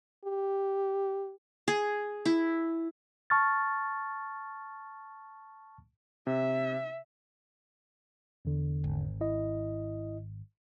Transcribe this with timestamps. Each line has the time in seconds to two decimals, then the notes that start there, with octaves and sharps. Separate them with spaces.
0.25 G4
1.68 G#4
2.25 E4
3.30 A5 C#6 F6 A6
6.27 C3 E5
8.45 E2 D3
8.84 G#1
9.21 E4 D#5